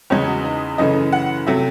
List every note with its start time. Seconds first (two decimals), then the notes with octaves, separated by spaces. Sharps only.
0.10 E2 C#3 G#3 C#5
0.27 F#4
0.44 D#4
0.78 F#2 C#3 E3 A3 D#5
1.12 F#5
1.46 C3 F#3 A3 E5